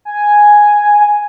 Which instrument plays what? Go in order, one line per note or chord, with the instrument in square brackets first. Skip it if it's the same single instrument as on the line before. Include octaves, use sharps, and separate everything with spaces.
[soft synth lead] G#5